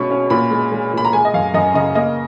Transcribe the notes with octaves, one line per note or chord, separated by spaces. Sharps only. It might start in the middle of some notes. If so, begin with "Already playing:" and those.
Already playing: B2 G#3 C#4 B5 C#6
C#4
A#2 B5
G#3
G#3
A#2 B5
A#5
G#3 G#5
D#5
F#2 F5
F#2 D#5
C#3 D#5
A#3 D#5